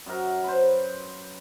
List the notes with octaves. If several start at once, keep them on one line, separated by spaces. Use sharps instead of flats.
F#2 F#3 A#4
B4 C5